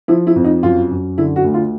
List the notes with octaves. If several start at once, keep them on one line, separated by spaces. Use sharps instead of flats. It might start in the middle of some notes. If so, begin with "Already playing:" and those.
F3 E4
E4
F2
D#4
F#2 F4
F#2
D3 E4
F#4
D2
F4